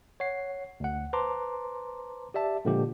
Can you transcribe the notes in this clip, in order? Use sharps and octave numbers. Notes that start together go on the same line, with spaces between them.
C#5 F#5 C7
D2 F#5
B4 C5 A5 A#5 C6 D6
G4 D5 E5 A5
A#2 D3 F3 G#3 A#3 G4